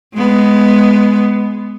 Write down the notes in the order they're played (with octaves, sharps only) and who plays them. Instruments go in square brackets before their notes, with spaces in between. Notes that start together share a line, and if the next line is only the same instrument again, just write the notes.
[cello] G#3 B3